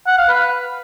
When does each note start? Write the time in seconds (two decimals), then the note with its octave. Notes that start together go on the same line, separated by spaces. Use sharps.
0.07 F#5
0.18 F5
0.29 B4